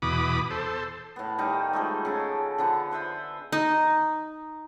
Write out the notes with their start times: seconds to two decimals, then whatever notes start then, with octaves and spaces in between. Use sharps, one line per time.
0.02 E2 B2 B5 D6 D#6
0.51 A4 C5
1.16 A2 B3
1.38 D#3 G3 D#4
1.73 F3 G#3 A3
2.05 C#3 A4 G#5
2.58 D3 F3 B3 C5
2.91 B4 C5 E5 B5
3.52 D#4